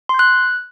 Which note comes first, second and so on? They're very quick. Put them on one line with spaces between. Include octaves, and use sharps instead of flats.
C6 G6 F#6